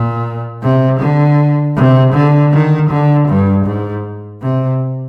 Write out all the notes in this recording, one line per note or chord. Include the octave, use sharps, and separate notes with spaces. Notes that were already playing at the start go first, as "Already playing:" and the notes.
Already playing: A#2
C3
D3
C3
D3
D#3
D3
G2
G#2
C3